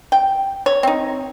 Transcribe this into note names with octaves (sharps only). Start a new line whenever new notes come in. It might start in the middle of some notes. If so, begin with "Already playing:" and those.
G5
C#5
C4 D#4